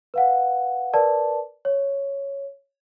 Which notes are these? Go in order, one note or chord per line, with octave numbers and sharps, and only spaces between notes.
B4 F5 F#5
A#4 B4 D5 A5
C#5